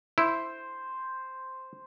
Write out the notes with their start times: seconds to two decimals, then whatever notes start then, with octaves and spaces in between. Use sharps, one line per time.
0.18 E4 C5